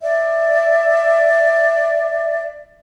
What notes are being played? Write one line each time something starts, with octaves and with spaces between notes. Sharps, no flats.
D5 E5